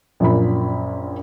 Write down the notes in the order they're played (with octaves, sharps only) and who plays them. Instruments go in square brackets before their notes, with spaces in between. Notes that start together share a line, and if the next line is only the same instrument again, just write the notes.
[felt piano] A#1 F#2 A#2 B5